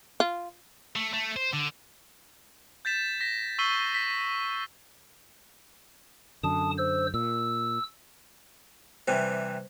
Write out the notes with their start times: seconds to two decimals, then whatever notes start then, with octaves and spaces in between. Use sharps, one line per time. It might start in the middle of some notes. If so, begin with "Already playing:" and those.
0.20 F4
0.96 A3
1.13 A3
1.36 C5
1.53 D3
2.85 G6 A6 B6 E7
3.21 A#6 B6
3.59 C#6 E6 B6 C7 D#7 G7
3.94 B6
6.43 F#2 D3 A5 D#6
6.78 C5 E6
7.14 A#2 E6
9.08 C3 E3 G3 C5